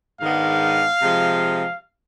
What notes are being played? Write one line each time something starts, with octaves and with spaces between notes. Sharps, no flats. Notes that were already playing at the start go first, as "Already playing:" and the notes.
G#2 D#3 G#3 B3 D4 F5
C3 F3 G#3